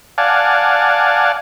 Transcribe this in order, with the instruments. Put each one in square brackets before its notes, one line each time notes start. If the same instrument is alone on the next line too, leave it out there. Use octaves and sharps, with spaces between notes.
[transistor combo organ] D5 F5 F#5 G#5 A5